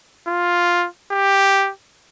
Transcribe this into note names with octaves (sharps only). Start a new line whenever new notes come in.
F4
G4